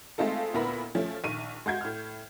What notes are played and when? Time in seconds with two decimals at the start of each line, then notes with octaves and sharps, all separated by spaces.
0.18 G#3 A3 C4 D#4 F4 A4
0.54 D2 A#2 B3 E4 A#4 B5
0.95 F3 A3 C#4
1.24 A#1 D#3 C#6 D#7
1.66 G#3 F#4 G6 G#6
1.81 A2 F6